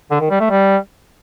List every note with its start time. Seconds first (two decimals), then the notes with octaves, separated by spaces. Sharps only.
0.11 D3
0.21 D#3
0.30 G3
0.40 A3
0.50 G3